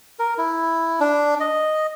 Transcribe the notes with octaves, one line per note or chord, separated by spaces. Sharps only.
A#4
E4
D4
D#5